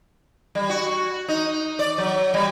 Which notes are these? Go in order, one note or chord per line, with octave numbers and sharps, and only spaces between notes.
G3
F#4
D#4
D5
F#3
G3